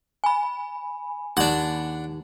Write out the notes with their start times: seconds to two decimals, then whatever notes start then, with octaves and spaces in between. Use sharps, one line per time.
0.24 G#5 B5
1.37 D#2 D4 F#5